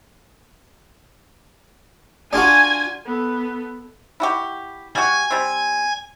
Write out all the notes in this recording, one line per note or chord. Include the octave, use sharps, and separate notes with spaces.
D4 F4 F#4 G#5
B3 A4
E4 F#4 G4
G3 F#4 G#5
G3 C4